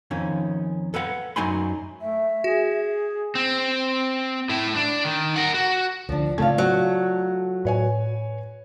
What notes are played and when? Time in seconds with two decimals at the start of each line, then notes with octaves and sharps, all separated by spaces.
0.11 F2 D#3 C#4
0.94 A4 B4 F5 F#5
1.36 F#2 F#3 D#4 G#5 B5 C6
2.01 A3 E5
2.44 F#4 G#4
3.35 C4
4.49 A2 E4
4.75 D4
5.05 D#3
5.36 A#4 F#5
5.54 F#4
6.09 D2 D3 F3 D4
6.38 C#3 A3 C4 F4 D5 F5 A5 G#6
6.58 F#3
7.65 A2 B4 C#5 G#5